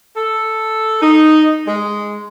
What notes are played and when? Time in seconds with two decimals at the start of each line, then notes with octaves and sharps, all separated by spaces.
0.15 A4
1.01 D#4
1.68 G#3